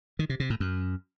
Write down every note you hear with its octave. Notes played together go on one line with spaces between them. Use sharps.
D#3
C3
C3
A2
F#2